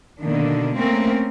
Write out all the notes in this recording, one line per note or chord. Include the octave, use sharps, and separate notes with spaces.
B2 D3 D#3 A#3 D4
A3 A#3 C4 C#4 A#4